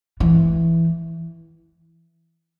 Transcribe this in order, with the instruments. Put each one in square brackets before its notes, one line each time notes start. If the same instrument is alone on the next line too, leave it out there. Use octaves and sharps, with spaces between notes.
[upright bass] E3